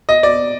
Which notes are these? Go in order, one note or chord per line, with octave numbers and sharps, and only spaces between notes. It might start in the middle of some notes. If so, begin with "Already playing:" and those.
D#5
D5